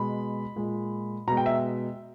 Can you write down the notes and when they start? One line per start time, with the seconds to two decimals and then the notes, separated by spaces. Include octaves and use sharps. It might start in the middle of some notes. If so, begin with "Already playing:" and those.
Already playing: B2 G#3 B5
0.56 A#2 G#3
1.28 B2 G#3 A#5
1.37 G5
1.46 E5